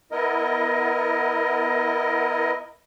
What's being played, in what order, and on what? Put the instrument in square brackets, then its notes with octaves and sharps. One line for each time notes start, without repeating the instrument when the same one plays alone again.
[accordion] B3 E4 A#4 D#5